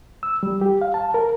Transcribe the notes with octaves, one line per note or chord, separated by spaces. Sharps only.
E6
G3
G4
F5
A5
A#4